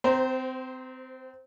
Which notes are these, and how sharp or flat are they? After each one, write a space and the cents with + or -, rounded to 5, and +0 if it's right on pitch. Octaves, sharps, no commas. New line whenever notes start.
C4 -25 C5 +0 A#5 +0